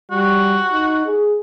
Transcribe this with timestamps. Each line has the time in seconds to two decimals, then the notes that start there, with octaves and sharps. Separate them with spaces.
0.11 G3 F#4
0.72 D#4
1.06 G#4